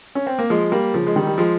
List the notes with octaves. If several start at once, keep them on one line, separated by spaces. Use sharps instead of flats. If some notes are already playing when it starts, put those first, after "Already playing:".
C#4
C4
A#3
F3 G#3
G3 A#3
C#3 F3
G#3
D#3 G3
G3
F3 G#3